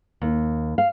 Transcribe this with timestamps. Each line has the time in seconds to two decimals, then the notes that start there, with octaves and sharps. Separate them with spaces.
0.22 D#2
0.78 F5